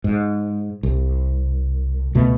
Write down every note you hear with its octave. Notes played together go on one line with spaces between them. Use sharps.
G#2
C2
C#2 B2 A3